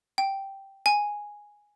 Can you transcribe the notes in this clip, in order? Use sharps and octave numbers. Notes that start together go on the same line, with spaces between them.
G5
G#5